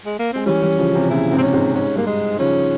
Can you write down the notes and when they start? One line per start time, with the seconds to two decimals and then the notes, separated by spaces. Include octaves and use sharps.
0.06 G#3
0.19 A#3
0.33 G#3 C4
0.46 E3 G3 C#4
0.62 E3 G3
0.78 C#3 F3
0.94 C3 E3
1.10 A#2 C#3 E4
1.32 G#2 C3
1.38 C4
1.42 C#4
1.53 G#2 C3
1.75 G#2 C#4
1.96 G2 A#3
2.07 G#3
2.39 C#3 F3 C#4